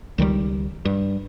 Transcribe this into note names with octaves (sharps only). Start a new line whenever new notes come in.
C#2 D#3 F#3 G3
G2